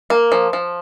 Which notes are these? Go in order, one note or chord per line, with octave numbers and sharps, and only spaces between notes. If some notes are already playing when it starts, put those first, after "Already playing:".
A#3
F3
F3